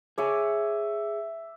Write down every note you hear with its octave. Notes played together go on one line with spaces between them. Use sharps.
G#4 C#5 E5 G#5 D6